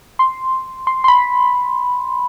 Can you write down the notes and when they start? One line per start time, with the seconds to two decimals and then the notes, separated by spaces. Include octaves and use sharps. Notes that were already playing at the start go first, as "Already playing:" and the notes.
0.19 C6
0.87 C6
1.04 C6
1.08 B5